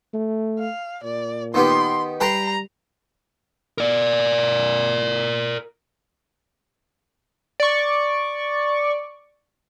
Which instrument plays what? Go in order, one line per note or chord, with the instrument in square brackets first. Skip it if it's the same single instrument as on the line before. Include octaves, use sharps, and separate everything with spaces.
[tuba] A3
[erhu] F5
[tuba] A#2 [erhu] D5
[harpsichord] D#3 B3 G4 [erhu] C6
[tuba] G3 [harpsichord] B4 G5 C6 [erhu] A#5
[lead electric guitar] A#4 D5
[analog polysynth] D5 C#6